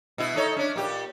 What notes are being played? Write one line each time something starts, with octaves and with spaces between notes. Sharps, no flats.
B2 E4 E5
D#4 A4 C#5
C#4 D4
A#2 G4